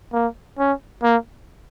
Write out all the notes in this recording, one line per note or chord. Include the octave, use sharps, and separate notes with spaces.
A#3
C#4
A#3